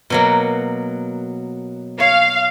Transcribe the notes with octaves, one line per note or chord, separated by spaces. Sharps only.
B2 F#3 A#3
C#5 F5